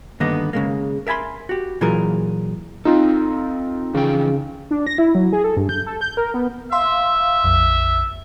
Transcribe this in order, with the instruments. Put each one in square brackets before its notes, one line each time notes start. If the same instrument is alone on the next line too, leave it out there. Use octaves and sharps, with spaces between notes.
[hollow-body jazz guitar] G2 D3 D#3 A#3 B3 D#5
C#3 G#3 A#3
A#4 E5 G#5 B5 C6
F#4 G4
A#2 E3 F#3 F4 G#4 A#4
[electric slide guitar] C4 A4 [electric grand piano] D#4 F4
[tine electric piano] C#3 [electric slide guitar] E3 F3 G5
[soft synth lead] D4
A#6
E4
F#3
G#4
A4
G2
G6
A4
G6
A#4
B3
[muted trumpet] E5 [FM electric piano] F5 C6 E6
[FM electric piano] A#1 F2